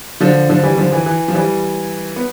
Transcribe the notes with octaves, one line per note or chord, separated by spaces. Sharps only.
D3 F3
D3 F3
E3 G3
D3 F3
E3
E3
F3
E3 G3
B3